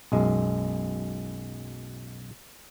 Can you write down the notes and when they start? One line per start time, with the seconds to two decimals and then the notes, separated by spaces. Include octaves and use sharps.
0.12 B1 F#2 G#3